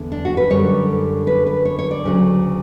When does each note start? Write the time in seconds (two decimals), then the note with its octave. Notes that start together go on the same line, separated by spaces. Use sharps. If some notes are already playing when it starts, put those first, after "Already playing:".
Already playing: E2 D3
0.12 D4
0.25 F#4
0.37 B4
0.50 F#2 D3 G3 C#5
1.27 B4
1.47 B4
1.65 C#5
1.79 C#5
1.91 D5
2.04 D2 C#3 F#3